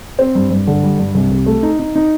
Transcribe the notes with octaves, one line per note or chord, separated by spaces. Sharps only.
C4
G2
G2
D3
G3
G2
C2
C2
A3
D#4
D#4
D#4